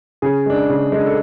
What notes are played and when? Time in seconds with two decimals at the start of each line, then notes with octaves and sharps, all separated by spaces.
0.22 C#3 G#4
0.46 G#3 D4
0.69 C#3
0.92 G#3 D4
1.06 A4